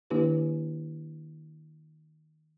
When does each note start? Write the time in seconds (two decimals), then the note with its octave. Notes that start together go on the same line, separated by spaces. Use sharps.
0.10 D#3 A#3 D4 E4 G4 B4